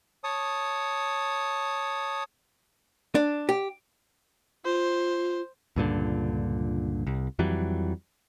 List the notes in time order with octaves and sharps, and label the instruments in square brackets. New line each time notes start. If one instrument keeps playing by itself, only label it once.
[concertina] C#5 A5 D#6
[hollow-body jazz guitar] D4
G4
[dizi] F4 [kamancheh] C5
[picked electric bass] C#2 G2 A#2 D3
C2
F2 E3 F#3 G3